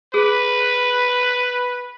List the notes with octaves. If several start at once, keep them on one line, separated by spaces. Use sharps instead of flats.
G#4 B4